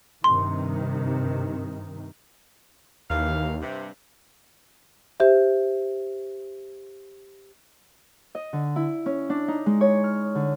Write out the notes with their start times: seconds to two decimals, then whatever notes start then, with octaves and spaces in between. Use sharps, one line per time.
0.24 G2 C3 D#3 C6
3.10 D#2 D#3 E3 F5
3.61 G2 C3
5.20 G4 C5 E5
8.35 D#5
8.53 D3
8.76 E4
9.06 C#4
9.30 D4
9.48 D#4
9.66 G#3
9.81 C#5
10.04 F6
10.35 D3